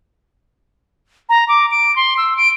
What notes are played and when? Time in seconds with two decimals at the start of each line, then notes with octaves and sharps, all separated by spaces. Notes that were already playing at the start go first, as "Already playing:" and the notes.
1.29 A#5
1.48 D6
1.71 D7
1.96 C6
2.17 E6
2.37 D7